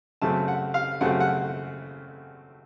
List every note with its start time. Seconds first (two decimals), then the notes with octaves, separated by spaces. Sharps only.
0.22 F#2 C#3 A3 C4 A5
0.48 F#5
0.74 F5
1.01 F#2 C#3 A3 C4 F#5
1.20 F#5